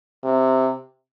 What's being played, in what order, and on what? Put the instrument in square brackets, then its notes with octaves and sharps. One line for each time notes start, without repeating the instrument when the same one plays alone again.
[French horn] C3